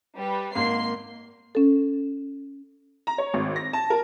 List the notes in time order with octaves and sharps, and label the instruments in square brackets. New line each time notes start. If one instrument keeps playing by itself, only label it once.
[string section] G3 B4
[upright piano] G#1 A#3 [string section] C6 C7
[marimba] C#4 A4
[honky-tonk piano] A#5
C#5
G#1
A#6
A5
A#4